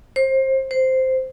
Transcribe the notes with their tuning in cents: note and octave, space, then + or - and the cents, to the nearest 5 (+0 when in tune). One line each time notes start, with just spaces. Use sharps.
C5 +25
C5 -5